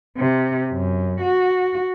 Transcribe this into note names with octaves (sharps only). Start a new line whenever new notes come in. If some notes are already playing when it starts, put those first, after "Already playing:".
C3
F#2
F#4